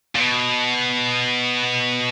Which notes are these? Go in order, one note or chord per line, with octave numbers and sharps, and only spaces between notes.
A#2
B2